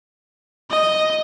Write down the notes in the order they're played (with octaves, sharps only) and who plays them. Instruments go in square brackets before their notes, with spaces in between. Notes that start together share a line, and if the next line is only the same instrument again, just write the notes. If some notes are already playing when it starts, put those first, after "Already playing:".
[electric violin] D#5